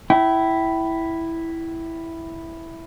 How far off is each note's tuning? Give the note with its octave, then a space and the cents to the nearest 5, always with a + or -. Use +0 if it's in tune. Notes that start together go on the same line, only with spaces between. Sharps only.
E4 +0 G5 -30